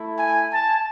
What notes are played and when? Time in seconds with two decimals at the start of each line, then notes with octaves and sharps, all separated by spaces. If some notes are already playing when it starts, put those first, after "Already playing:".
Already playing: A3 E4
0.17 G#5
0.52 A5